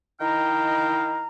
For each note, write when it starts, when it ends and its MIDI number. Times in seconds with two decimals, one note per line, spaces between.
0.20 1.27 51
0.20 1.27 64
0.20 1.27 75
0.20 1.27 77
0.20 1.27 79
0.20 1.27 82